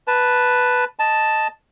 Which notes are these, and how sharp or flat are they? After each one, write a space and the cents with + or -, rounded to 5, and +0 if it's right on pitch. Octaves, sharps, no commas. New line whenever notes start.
B4 +0 A5 +0
D#5 +0 A5 +0